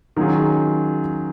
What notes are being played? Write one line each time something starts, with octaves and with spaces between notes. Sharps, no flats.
D#3 F#3 C#4 F4 G#4